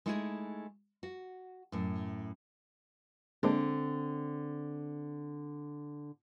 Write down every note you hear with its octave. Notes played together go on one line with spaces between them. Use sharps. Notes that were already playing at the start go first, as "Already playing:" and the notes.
G#3 A3 D#4 E4 G4 G#4
F#4
F#2 A2
D3 G#3 A#3 C4 D4